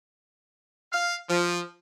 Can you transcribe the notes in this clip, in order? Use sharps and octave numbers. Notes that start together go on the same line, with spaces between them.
F5
F3